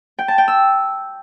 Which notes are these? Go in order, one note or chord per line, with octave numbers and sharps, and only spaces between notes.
G5
A5
G5
E6